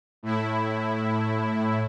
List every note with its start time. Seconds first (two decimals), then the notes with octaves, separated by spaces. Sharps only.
0.23 A2 E4